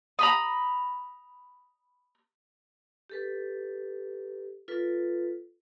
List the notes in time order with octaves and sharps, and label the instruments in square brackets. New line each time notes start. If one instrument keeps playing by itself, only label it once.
[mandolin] A#5 B5 D#6
[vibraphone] G4 A4 B4
F4 A4 B4